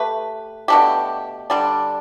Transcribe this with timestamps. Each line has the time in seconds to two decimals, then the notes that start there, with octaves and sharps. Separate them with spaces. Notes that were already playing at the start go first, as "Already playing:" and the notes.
Already playing: A3 G4 B4
0.68 B2 A3 D4 G4
1.50 D3 G3 D4